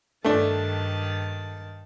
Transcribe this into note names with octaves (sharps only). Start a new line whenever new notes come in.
G2 D#3 A3 D4 A5